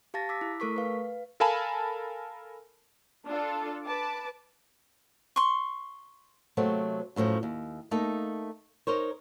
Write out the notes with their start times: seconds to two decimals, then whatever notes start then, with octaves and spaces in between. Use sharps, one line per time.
0.14 G4 F5 A5 A6 A#6
0.29 D6 E6 B6
0.41 E4
0.60 A3 A4 A#4 C#6 B6
0.76 B4 F5
1.40 A4 A#4 F5 G#5 A5 B5
3.26 D4 F4 A4
3.86 B4 A5 D6
5.36 C6 C#6
6.57 C3 F#3 A3 A#3 C4
7.16 F#2 A2 D3 F3
7.43 D#2
7.91 A3 A#3 D#4 A4
8.87 D#4 A#4 C5 C#5